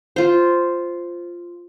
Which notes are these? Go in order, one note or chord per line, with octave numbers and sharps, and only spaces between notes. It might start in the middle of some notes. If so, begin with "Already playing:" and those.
F4 C5